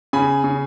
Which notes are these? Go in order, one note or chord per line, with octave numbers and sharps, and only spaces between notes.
C#3 G#5 B5
C#3